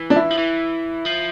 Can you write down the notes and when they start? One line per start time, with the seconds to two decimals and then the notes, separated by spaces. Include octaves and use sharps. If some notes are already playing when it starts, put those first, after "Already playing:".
Already playing: E3
0.10 D4
0.16 E4
0.31 F3
0.38 E3
1.06 F3